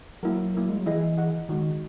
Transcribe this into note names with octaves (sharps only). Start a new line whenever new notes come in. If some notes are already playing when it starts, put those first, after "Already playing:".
F#3 A#3 E4 A#4
A#3 E4 A#4
G#3
F#3
E3 E4 G#4 D#5 F#5
E4 G#4 D#5 F#5
D#3 G#3 D#4 F#4